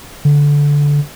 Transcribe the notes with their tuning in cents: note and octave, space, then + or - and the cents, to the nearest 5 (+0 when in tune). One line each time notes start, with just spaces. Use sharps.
D3 -15